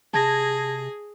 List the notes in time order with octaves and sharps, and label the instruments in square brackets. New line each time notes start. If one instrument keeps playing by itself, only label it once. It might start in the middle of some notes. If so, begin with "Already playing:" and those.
[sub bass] C3 [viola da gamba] G#4 [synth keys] A5 G#6 A#6